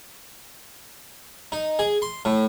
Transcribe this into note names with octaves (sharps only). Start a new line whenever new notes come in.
D#4
G#4
C6
A2